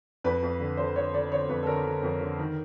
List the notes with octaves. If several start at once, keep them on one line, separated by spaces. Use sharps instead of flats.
F2 B4
F2
D3
D3 C5
D3 C#5
D3 D5
D3 C#5
F2 B4
A4
D3 A#4
D3
F2
D3
D#3